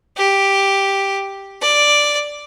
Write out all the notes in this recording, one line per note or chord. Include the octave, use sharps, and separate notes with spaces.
G4
D5